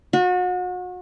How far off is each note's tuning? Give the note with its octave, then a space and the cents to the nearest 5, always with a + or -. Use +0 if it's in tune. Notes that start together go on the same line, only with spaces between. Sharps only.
F#4 -35